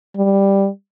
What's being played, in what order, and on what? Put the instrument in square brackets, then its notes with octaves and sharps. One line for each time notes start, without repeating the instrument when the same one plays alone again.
[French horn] G3